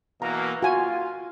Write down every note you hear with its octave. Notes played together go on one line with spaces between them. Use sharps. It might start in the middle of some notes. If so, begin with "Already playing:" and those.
B2 E3 A#3 A#5
F4 F#4 G#5